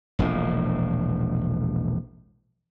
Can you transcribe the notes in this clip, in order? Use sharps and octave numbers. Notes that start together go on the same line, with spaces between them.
E1 A#1 A2